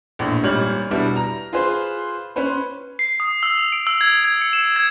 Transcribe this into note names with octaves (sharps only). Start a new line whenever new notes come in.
A#1 E2 A2
G#1 A#2 G3 C#5 F6 F#7
B2 G3 B3 D4 E4
A#5
F4 G#4 B4 C5
C#4 B4 C5 C6
C7
D#6
E6
F7
D7
E6
G#6
G#6
C#7
E7
G#6